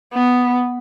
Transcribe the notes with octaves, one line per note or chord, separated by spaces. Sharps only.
B3